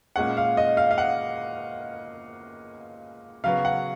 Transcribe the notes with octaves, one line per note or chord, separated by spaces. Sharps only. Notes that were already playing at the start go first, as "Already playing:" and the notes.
A#2 G#3 C#4 F#5
F5
D#5
F5
F5
F#5
C#3 F#3 B3 F5
F#5